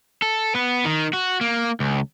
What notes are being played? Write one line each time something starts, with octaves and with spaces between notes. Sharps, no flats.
A4
B3 B4
D#3
F#4
A#3
C#2